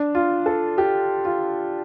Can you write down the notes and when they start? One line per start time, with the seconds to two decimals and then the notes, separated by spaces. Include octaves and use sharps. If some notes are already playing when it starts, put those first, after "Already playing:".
Already playing: D4
0.15 F4
0.46 A4
0.78 G4
1.25 F4